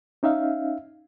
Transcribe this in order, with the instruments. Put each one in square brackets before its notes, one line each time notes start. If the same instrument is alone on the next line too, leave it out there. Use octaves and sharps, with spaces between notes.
[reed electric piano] C#4 D#4 E5 F5